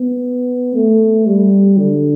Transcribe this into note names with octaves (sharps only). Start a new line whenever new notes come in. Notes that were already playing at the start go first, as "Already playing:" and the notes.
Already playing: B3
A3
G3
D3